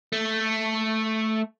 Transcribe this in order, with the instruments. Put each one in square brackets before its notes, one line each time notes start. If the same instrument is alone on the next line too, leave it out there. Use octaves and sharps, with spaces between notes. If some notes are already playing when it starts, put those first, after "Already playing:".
[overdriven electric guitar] A3